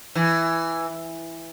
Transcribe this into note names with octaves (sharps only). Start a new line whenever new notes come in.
E3